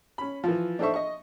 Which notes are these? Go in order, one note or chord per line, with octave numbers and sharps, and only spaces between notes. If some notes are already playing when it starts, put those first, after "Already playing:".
C#4 B5
E3 F3
D4 D#4 A4 C5 E5 C#6
D#5 C#6